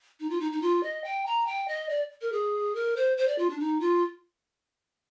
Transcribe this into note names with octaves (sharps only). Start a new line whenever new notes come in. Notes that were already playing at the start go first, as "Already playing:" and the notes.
D#4
F4
D#4
D#4
F4
D#5
G5
A#5
G5
D#5
D5
A#4
G#4
A#4
C5
C5
D5
F4
D4
D#4
F4